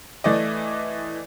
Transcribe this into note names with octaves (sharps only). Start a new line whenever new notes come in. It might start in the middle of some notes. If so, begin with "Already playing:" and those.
E3 A3 D5 D#5